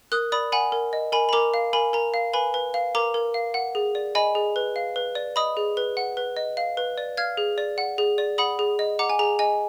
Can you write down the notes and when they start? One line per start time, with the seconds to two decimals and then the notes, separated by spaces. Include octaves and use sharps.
0.12 A#4 D#6 F#6
0.32 D5 B5 D#6
0.52 F#5 G#5 B5
0.72 A#4
0.93 D#5
1.12 A#4 G#5 B5
1.29 B5
1.33 A#4 A#5 D6
1.54 F5
1.73 A#4 G#5 B5
1.93 A#4 A#5
2.14 F5
2.33 B4 G#5 B5
2.54 B4
2.74 F5
2.95 A#4 A#5 D6
3.14 A#4
3.34 F5
3.54 F#5
3.75 G#4
3.95 D5
4.15 D#5 G#5 B5
4.35 G#4
4.56 B4
4.76 F5
4.96 B4
5.15 D5
5.36 D#5 B5 D#6
5.57 G#4
5.77 B4
5.97 F#5
6.17 B4
6.37 D#5
6.57 F5
6.77 B4
6.98 D5
7.17 F5 F6 G#6
7.37 G#4
7.58 D5
7.78 F#5
7.98 G#4
8.18 D5
8.38 F#5 B5 D#6
8.59 G#4
8.79 D#5
8.99 F#5 A#5 D6
9.10 G#5
9.19 G#4 A#5
9.39 D#5 G#5